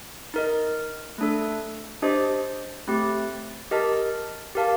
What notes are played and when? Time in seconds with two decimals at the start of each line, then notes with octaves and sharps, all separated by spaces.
0.34 D#4 A#4 D#5
1.18 A3 D4 A4
2.02 D4 G4 C5 D#5
2.87 A3 C4 G4
3.71 G4 A#4 D#5 A5
4.55 G4 A#4 F5 A5